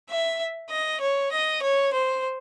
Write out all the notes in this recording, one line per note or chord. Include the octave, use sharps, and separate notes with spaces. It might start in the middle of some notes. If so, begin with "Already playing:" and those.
E5
D#5
C#5
D#5
C#5
C5